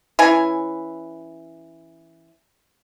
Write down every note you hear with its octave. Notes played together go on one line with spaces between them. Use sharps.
E3 C#4 G#5